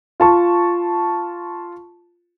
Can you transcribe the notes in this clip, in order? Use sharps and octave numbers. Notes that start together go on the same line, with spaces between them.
F4 A5 C#6